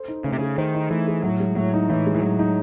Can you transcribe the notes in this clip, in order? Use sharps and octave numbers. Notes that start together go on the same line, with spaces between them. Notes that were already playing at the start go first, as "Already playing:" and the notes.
Already playing: A4 C5
D#4
C#3 A3
C3
C#3 G#4
D#3 C5
D#4
E3 A3
G#4
A2 F#3
G#3
A2 F#3
D#4
A2 E3
G#3
E3
A2 F#3
D#4